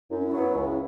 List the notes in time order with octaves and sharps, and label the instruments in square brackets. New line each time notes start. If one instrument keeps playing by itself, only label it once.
[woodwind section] F#2 [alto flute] E4
[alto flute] C#4
E4
[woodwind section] F#3 B3
C#2